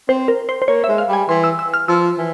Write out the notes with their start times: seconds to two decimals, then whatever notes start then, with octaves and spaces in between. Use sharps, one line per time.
0.09 C4 C5
0.28 A#4
0.49 C5
0.62 C5
0.68 A#3 C#5
0.84 G#3 E5
0.98 F5
1.09 G3 G#5
1.29 E3 C6
1.44 E6
1.59 E6
1.74 F6
1.88 F3 E6
2.18 E3